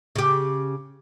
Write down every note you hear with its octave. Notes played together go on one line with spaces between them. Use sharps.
C#3 G4